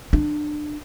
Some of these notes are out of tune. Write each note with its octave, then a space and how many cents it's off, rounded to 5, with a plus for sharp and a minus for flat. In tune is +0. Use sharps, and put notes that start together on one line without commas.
D4 +25